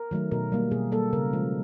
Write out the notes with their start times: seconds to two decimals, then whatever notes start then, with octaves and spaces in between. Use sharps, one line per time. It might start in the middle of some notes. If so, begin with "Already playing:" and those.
Already playing: A#4
0.11 D#3 F#3 A3
0.31 B2 A#4
0.52 G3 A#3
0.71 B2 G#4
0.92 G3 A#3 A4
1.13 C#3 A#4
1.33 F3 G#3